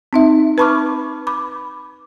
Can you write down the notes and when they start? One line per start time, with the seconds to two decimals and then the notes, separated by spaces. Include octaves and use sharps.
0.13 C4 D#4 E5
0.58 B4 A5 B5 C#6 D6 F6
1.27 B5 D6